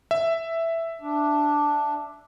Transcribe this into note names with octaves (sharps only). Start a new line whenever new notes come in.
E5
D4